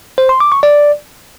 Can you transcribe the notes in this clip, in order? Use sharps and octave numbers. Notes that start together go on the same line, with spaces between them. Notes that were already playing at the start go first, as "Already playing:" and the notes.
C5
C6
D6
C#6
D5